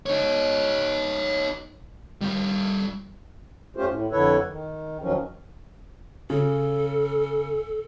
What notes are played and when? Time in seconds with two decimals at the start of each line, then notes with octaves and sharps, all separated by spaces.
0.06 D#4 C#5
2.21 G3 F4
3.77 F#2 A3 C#4 F4 G4 C5
3.89 A2
4.12 F2 D3 E4 A4 B4 C#5
4.49 D#3
5.02 E2 D#3 F3 F#3 C#4
6.30 C#3 A4